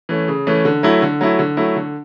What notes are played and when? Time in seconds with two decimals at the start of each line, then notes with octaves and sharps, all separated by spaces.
0.09 E3 A3 C#4
0.28 C#3
0.47 E3 A3 C#4
0.65 D3
0.83 F#3 A3 E4
1.02 D3
1.21 F#3 A3 E4
1.39 D3
1.57 F#3 A3 E4
1.76 D3